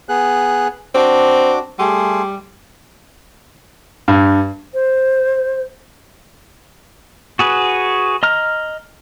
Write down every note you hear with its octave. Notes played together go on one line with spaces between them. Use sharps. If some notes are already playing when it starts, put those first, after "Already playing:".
B3 G#4 F#6
C4 D4 F#4 D6
G3 A3 G#4 C6
G2
C5
F#4 G#4 B4
D#5 A#5 F6